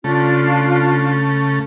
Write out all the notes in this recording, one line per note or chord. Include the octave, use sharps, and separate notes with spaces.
C#3 A3 D4 F4